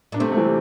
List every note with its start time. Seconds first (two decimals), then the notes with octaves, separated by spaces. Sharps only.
0.12 A#2 D4
0.19 C3 A3 C4
0.32 A3
0.37 E3 G3